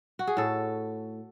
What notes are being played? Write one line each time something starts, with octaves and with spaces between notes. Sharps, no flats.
F#4
G#4
A2 A4